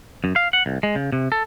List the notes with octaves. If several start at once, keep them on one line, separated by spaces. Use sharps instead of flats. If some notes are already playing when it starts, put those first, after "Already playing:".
F#2
F5
F#5
C2
G#3
C#3
C3
A4